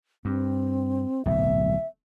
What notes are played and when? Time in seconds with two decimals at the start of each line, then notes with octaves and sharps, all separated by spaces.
0.25 G2 C4
1.26 D1 B1 G#2 E5